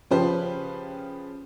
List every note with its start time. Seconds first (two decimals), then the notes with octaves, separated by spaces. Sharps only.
0.11 C#3 F3 C#4 G4 B4 C5